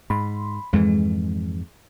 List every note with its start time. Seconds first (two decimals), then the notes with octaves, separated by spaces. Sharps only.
0.10 G#2 B5 C6
0.73 F2 G#2 E3 G#3